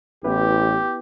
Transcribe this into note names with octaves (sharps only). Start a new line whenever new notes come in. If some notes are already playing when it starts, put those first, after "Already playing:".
A1 B3 E4 G4 B4